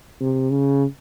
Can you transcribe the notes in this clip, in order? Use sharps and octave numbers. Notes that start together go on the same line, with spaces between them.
C3
C#3